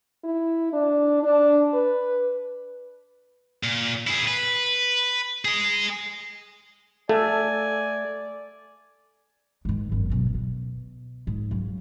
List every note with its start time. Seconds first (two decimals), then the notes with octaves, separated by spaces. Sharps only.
0.24 E4
0.73 D4
1.23 D4
1.73 B4
3.63 A#2
4.07 E4 G#4
4.28 B4
5.45 G#4 D#5
7.09 A3 A4 D5 F5 G#5
9.65 G#2 D#3
9.91 G1 F#2
10.10 B2 F#3
10.34 B2
11.27 G#2
11.51 C#3 F#3